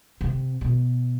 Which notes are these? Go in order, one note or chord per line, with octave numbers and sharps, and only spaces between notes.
C3
B2